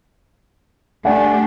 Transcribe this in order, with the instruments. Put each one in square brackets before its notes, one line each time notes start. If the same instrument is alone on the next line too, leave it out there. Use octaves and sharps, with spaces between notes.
[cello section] A3 D4 G4 [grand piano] D5 F#5 G#5